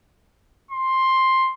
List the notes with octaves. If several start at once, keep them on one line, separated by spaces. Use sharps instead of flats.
C6